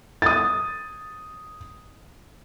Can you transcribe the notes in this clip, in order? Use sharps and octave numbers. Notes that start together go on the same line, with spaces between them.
D#6 A6